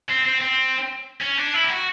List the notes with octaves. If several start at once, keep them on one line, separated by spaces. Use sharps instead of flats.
C4
C4
C4
C#4
D4
E4
G4
F#4